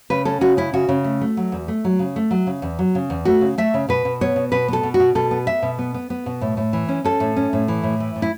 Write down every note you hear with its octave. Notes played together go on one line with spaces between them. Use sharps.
C#3 B4
C#4 A4
C#3 F#4
C#4 E4
C#3 F#4
C#3
A3
A3
F#3
E2
A3
F#3
C#3
A3
F#3
C#3
E2
F#3
C#3
E2
A3 F#4
C#3
A3 E5
C#3
B2 B4
B2
B3 C#5
B2
B2 B4
B3 A4
B2
F#4
B2
B2 A4
B3
B3 E5
B2
B3
B3
B3
B2
A2
A2
E3
C#4
C#4 A4
A2
C#4
A2
E3
A2
E3
A2
E4